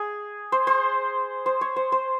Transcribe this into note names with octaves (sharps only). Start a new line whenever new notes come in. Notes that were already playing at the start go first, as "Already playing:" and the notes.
Already playing: G#4
C5
C5
C5
C#5
C5
C5